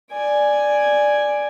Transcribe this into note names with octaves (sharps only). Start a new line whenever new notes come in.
D5 G#5